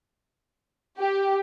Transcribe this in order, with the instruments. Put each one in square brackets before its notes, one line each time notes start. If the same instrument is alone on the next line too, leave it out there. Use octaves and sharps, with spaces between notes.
[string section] G4